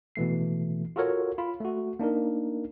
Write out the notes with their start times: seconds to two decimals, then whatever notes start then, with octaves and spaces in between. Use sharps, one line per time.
0.16 B2 E3 A3 C7
0.96 F4 F#4 A4 A#4 C#5
1.38 F4 B5
1.60 A3 F#4
1.99 A#3 D4 D#4 A#4